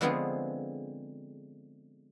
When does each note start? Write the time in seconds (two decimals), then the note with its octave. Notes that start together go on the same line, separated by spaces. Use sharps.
0.01 D3 F3 G#3 B3 C4 G#4